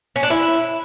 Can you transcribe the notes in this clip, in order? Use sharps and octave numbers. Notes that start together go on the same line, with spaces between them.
C#4
D4
E4